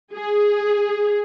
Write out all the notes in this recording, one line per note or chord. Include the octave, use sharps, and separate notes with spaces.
G#4